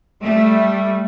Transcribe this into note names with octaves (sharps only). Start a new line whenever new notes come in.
G3 A3